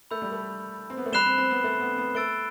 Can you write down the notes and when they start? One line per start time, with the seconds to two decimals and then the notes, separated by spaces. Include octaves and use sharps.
0.11 A3 B5 E6 G6
0.22 G3
0.32 A3
0.90 C4
0.97 B3
1.06 A3
1.12 G3 B5 F#6 C7 E7 G7
1.26 C4
1.38 C4
1.51 B3
1.64 A3
1.80 B3
1.98 B3
2.15 A3 E6 A6 D7 G7